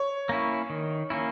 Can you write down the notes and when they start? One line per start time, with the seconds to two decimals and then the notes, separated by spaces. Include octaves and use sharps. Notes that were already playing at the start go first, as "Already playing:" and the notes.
Already playing: C#5
0.29 A#3 C#4 E4
0.70 D#3
1.10 A#3 C#4 E4